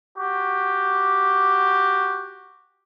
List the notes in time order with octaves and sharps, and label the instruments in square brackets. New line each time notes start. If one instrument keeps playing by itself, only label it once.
[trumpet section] F#4 G4